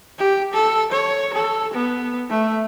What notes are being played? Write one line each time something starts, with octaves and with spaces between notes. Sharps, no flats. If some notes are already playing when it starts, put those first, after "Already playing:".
G4
A4
C#5
A4
B3
A3